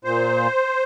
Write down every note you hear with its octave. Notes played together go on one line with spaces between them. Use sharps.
A#2 C5